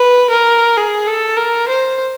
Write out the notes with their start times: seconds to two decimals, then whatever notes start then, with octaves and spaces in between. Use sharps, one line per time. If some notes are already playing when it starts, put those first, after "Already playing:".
Already playing: B4
0.30 A#4
0.77 G#4
1.07 A4
1.37 A#4
1.68 C5